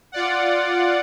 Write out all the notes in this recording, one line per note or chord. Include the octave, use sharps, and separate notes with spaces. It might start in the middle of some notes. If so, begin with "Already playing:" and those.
F4 D5 F#5